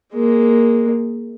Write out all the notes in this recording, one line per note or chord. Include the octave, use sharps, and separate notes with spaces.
G#3 A#3